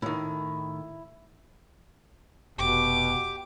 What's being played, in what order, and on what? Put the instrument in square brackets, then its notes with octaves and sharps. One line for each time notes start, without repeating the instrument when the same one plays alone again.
[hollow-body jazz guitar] A2 D#3 [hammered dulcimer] E4
[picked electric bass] F1 [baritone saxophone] B2 [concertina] G4 [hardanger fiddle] D6